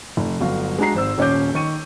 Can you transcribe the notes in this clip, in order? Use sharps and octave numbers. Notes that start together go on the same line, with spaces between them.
F1
G1 F#3 F5
G#3 D4 F#4 A#5 C7
G#1 C5 E6
D#1 C#4 C#5 D6 G6
D#3 C#6 D#7